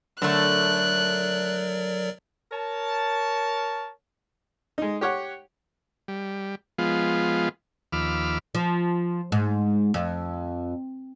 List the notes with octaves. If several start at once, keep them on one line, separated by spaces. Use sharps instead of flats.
D3 F#3 A3 A#4 D5 F#6
A#4 C#5 A5
G#3 D#4
G4 C#5 F#5
G3
F3 G#3 B3 F4
D#2 F3 B5 D6 E6 F6
F3
G#2
F2